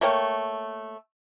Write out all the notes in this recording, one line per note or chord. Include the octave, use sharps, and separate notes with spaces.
A3 A#3 C#5 G5